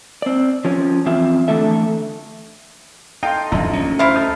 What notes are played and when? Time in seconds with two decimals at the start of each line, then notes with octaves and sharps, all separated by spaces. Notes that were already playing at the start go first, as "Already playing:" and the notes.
0.22 C4 D5
0.65 F3 C#4
1.06 F2 E3 C4 F4 E5
1.48 D3 E3 A3 E4 A4 E5
3.23 D#4 A4 F5 G5 C6
3.52 D#1 A#1 F#2
3.73 D2 C#4
3.99 E4 C5 F5
4.16 D#4 A4